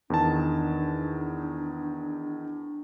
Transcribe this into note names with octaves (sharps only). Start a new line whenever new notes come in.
E2 D#3 D4 A5